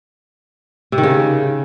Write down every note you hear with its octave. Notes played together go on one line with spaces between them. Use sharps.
C3
D#3
C#3